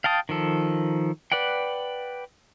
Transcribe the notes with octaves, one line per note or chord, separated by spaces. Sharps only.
F5 G5 A5 D#6
D#3 F3 A4
B4 D5 F#5 G5